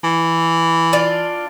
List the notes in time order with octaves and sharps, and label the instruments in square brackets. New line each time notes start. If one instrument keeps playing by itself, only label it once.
[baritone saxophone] E3
[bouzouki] D4 F4